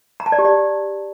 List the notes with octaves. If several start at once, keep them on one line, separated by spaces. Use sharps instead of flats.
A#5
A5
D5
G4
D5